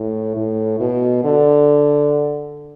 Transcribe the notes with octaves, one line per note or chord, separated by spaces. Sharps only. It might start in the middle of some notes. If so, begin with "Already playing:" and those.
Already playing: A2
A2
B2
D3